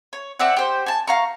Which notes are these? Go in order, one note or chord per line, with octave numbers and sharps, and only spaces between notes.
C#5
C4 D5 E5 F#5
G4 C5
G#5 A5
F5 A#5 C#6